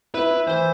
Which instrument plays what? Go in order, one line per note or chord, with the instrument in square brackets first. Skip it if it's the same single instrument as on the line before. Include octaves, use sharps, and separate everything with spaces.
[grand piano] E4 [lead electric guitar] B4
[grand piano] E4
[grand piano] E3 [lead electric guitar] C5